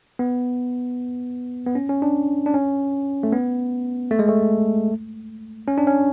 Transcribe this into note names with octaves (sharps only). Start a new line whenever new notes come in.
B3
B3
C#4
C#4
D4
D4
C#4
A3
B3
A3
G#3
A3
C#4
D4
C#4